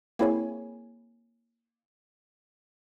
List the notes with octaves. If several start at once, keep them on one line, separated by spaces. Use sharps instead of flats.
A#3 C4 E4 G#4 C#5 G#5